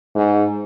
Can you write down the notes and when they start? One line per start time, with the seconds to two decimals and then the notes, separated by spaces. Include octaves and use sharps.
0.15 G#2